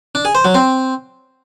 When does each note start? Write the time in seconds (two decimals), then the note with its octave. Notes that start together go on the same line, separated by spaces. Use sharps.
0.15 D4
0.25 G#4
0.35 C5
0.45 F#3
0.54 C4